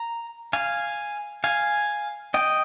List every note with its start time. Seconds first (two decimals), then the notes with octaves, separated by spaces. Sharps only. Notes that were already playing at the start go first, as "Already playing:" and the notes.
Already playing: A#5
0.53 F5 G#5
1.44 F5 G#5
2.34 D#5 G5